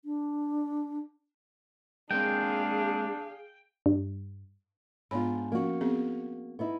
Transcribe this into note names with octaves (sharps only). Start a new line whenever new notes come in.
D4
G#3 A#3 C4 D4 G#4 F5 G5
G2
G#2 B3 D4 F4 C#5 B5
F3 A#3 C#4 F#4
B3 C4 G#4
B3 D#4 E4